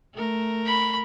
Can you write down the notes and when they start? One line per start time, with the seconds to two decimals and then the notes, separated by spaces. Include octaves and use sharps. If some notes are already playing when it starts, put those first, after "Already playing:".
0.13 A3 A#4
0.66 B5